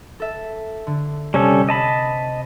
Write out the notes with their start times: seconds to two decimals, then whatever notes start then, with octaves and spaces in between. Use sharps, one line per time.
0.20 A4 E5
0.87 D3
1.34 C3 G3 C#4 A4
1.69 D#5 A5 B5